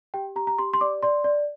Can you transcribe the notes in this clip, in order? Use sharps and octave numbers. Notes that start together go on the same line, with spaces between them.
G4 G5
G4 A#5
A#5
G4 C6
C6
D5 D6
D5 C6
D5